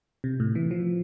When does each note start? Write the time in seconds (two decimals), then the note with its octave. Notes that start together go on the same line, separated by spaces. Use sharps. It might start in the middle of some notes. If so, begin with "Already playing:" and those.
0.24 C3
0.40 A2
0.55 E3
0.71 F3